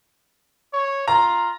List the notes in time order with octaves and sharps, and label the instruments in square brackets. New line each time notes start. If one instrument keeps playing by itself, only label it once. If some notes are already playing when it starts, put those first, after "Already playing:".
[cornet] C#5
[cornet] F4 [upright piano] A#5